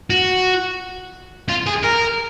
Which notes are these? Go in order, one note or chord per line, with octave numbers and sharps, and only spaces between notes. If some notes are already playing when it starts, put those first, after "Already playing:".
F#4
F4
G#4
A#4